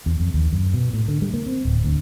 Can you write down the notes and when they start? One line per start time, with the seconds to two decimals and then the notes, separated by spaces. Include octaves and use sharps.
0.06 E2
0.20 F2
0.34 D#2
0.53 F#2
0.73 B2
0.93 A2
1.08 D3
1.22 G3
1.34 A#3
1.46 C4
1.65 D1
1.84 D2